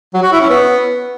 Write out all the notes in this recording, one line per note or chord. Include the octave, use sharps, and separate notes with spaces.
F#3
F#4
E4
C#4
B3